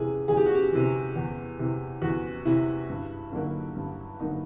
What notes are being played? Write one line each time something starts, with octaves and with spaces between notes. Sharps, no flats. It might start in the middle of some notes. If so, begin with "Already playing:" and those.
Already playing: E2 C3 E3 G#4
E2 G#4
G4
F#4
G4
C3 E3
E2
C3 E3
E2 F#4
C3 E3 E4
G2
D3 F#3 A#3 D#4
G2
D3 F#3 A#3 D#4